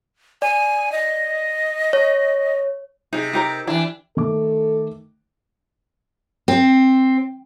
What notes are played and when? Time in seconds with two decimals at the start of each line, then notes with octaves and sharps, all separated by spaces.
0.42 D5 G#5
0.92 D#5
1.93 C#5
3.13 C3 D#4 G#4
3.33 D#4 G4 A#4
3.67 E3 D4 E4 G4
4.17 D#3 A3 A4 D6
6.48 C4